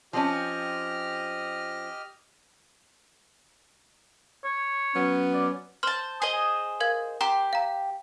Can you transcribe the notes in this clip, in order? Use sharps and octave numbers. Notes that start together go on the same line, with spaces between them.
F3 C4 C#4 G4 D#5 F6
C#5
F#3 B3 C#4
D5
C5 A5 C6 F6
G#4 C5 D#5
A#4 F5 G#6
G4 A#5 C6
F5 A#5